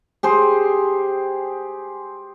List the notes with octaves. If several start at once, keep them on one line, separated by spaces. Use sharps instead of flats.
G4 G#4 C5